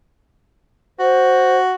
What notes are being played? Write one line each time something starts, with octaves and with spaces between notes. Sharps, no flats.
F#4 C5